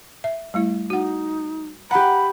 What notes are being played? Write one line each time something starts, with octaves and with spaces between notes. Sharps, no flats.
E5
G3 A3 E4
D#4 F#4 F#5
G4 F#5 A#5 B5